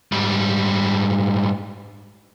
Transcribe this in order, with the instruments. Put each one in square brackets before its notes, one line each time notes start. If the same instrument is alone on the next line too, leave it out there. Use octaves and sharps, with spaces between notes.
[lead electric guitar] G#2 G3